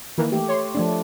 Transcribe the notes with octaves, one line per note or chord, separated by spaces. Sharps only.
D#3 E3 A#3
A3 G4
C#5 C6
F3 A3 D4